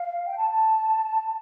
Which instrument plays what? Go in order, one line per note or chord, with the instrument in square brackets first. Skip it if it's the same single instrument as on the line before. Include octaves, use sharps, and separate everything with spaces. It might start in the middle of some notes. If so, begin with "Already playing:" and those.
Already playing: [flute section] F5
G5
A5
A5